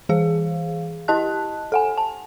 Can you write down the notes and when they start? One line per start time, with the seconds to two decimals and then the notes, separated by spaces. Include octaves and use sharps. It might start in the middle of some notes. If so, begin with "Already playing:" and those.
0.09 E3 G#4 F5
1.08 E4 G4 D#5 A5 F#6
1.72 A4 F#5 G#5
1.98 A5